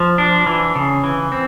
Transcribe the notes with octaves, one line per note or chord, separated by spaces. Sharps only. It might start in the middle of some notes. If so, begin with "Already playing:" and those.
Already playing: F3
D4
E3
C#3
E3
C4